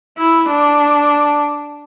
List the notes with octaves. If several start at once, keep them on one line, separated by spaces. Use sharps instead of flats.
E4
D4